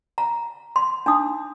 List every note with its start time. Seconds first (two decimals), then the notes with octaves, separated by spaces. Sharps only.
0.18 A#5
0.76 C6
1.06 D4 D#4 D#6